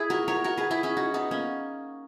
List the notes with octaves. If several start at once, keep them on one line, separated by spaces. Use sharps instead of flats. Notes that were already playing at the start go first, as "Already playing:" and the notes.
Already playing: E4 G#4
F#4 A#4
A#4 C#5
F#4 A#4
G#4 B4
E4 G#4
C#4 E4
D#4 F#4
B3 D#4
A#3 C#4